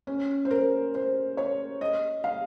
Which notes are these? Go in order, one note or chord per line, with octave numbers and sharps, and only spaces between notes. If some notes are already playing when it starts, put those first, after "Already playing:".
C#4
C5
A#4
C5
C#5
D#5
F5